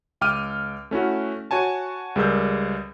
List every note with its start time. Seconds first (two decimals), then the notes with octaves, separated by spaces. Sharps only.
0.21 C#2 G5 D6 F6 D#7
0.91 A3 C#4 E4 F#4
1.51 F#4 C#5 G#5 A5
2.16 C#2 G3 G#4 A#4 E6 G6